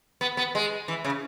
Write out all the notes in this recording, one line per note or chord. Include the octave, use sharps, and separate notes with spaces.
B3
B3
G#3
E3
C#3